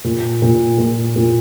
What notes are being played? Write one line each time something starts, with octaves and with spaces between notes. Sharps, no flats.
A#2
A#2
A#2
A#2